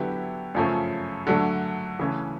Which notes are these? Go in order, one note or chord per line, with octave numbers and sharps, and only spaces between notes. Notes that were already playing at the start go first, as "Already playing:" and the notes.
Already playing: D3 F#3 B3 E4 G4
F#2 C#3 F3 A3 C#4
D3 F#3 A3
C#3 E3 A3 C#4